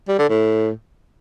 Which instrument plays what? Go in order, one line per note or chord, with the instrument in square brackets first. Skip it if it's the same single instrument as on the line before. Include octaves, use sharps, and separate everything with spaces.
[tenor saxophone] G3
D3
A2